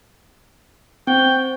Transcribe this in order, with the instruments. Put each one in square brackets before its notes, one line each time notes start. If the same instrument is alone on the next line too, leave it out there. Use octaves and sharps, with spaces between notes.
[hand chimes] C4 [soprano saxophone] G5